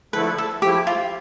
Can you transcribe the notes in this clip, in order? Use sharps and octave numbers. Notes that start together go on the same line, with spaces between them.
D3 F3 A3 E4 A4 B4
A4
F3 A3 E4 G4
F4